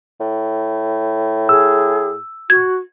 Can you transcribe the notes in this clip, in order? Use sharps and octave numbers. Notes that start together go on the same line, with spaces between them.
A2
G#4 E6
F#4 G#6